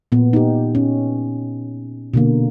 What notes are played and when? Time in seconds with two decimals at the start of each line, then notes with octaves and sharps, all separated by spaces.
0.12 A#2 B3
0.33 D#4 G4
0.75 C#4
2.14 B2 D3 A#3